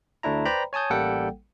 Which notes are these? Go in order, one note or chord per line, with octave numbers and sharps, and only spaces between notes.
D2 A3 D4 E4 A#5
B4 C5 D5 G5 A#5 B5
C#5 G#5 A5 D#6 G6
A1 G3 A#3 A4 F#5 G5